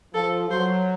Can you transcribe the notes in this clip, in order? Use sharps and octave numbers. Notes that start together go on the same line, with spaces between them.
F3 A4
F#3 C5